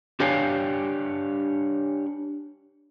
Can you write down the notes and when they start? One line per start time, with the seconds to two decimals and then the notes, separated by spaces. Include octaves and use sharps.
0.20 D4 G4 B4 C#5 F5 G#5